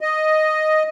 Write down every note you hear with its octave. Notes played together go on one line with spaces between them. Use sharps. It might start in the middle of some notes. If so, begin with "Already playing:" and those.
D#5